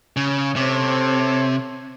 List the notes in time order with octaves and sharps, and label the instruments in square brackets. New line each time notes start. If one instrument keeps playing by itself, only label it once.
[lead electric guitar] C#3
[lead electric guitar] C3 [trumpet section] C4 A4 C#5